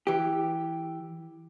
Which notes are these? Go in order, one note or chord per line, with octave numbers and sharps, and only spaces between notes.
E3 G4